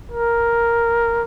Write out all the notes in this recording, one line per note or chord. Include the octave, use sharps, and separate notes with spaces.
A#4